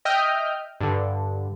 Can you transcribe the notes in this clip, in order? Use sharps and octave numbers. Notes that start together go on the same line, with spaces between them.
D#5 E5 G5 D#6 F6 G6
G2 D3